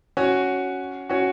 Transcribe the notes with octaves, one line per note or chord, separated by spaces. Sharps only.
C#4 F#4
C#4 F#4